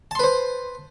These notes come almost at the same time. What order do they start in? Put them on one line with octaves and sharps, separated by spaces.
A5 C6 B4 C5